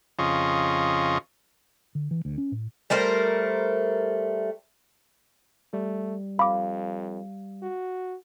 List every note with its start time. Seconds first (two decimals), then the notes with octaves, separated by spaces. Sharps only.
0.19 F2 C#3 F4 D#5 C#6
1.95 D3
2.11 E3
2.25 D2
2.38 C#4
2.52 A2
2.90 G3 A3 A#4 C5
5.73 G3 A3
6.39 F2 F5 B5 D6
7.63 F#4